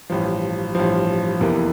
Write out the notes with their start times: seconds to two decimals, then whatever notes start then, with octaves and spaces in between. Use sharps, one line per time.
0.10 A1 G2 F3
0.75 A1 G2 F3
1.40 F1 E2 C3 E3 A#3